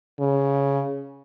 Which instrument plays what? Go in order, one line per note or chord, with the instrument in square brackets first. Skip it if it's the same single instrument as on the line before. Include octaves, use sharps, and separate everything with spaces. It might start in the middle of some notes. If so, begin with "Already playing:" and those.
[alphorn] C#3